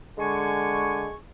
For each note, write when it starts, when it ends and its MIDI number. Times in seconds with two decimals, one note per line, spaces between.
0.18 1.09 50
0.18 1.14 56
0.18 1.14 80
0.18 1.14 85